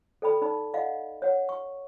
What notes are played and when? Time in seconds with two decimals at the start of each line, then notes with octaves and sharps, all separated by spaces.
0.22 A4 D5 G5 B5
0.42 D#4 D5 B5
0.74 D5 D#5 F5 F#5
1.22 C#5 F#5
1.49 C#6